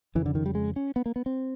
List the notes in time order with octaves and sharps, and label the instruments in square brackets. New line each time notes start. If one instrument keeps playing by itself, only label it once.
[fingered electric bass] F2 C#3 E3
D3
D#3
G3
G#3
C#4
B3
A#3
B3
C4